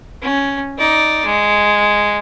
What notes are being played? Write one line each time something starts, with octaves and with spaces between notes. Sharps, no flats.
C#4
D#4 D5
G#3